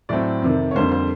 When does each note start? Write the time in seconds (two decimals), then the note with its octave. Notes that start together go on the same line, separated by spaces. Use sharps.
0.09 A2 F#3 A3 C4 D5
0.42 F2 C3 D#3
0.71 C#5
0.75 F2 D3 G3 A#3 C5
0.92 C5